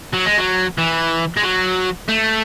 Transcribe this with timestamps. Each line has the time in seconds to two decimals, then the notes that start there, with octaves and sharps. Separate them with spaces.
0.14 F#3
0.26 G#3
0.38 F#3
0.78 E3
1.37 G#3
1.43 F#3
2.09 A3